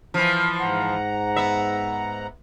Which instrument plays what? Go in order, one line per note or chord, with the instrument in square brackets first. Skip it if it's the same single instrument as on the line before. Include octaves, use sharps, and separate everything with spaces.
[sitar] E3 F3
[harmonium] G#2 F#5 A#5
[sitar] B3 E5